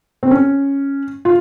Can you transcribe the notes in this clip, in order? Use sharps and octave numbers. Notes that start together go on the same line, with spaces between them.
C4
C#4
F4